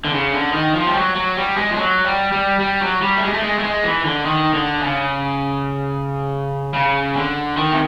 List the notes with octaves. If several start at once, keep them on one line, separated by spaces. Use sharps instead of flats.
D3
C#3
D3
D#3
F3
G3
F#3
F#3
G3
G#3
F3
F#3
G3
G3
G3
F#3
G3
A3
G#3
A3
G#3
A3
G#3
E3
D3
D#3
D3
C#3
C#3
D3
D#3
C3